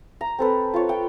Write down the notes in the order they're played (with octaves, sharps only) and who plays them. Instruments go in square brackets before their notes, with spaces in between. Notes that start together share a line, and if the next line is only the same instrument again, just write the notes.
[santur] A#5
C4 A4 B4
F4 C#5
G5